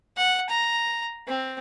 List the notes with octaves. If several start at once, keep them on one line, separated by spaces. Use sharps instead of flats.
F#5
A#5
C4